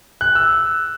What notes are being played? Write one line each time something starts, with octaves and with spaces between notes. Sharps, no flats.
F#6
E6